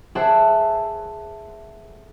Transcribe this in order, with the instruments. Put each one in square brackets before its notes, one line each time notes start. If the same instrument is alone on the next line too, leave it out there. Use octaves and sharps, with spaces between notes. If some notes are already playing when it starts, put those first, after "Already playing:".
[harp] G#4 A4 C5 D5 E5 F#5